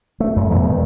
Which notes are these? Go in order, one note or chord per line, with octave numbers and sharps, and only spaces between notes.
A3
F#2
E2 B2
E2 D#3 G#3